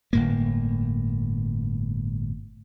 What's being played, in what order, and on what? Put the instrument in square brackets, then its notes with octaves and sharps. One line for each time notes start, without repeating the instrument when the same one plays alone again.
[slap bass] G1 A2 A#3